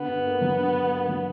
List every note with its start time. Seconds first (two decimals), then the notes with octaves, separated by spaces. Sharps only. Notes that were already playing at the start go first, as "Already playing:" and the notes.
Already playing: D3 B3
0.08 G2
0.25 A#3
0.41 F#3
0.58 D3
0.75 G2
0.91 A#3
1.08 F#3